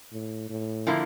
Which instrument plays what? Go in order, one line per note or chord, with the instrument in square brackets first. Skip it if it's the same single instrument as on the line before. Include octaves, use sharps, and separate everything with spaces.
[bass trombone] A2
A2
[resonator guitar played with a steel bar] D3 F3 A#3 E4